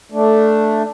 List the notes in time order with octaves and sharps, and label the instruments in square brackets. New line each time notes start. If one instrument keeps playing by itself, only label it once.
[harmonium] A3 D4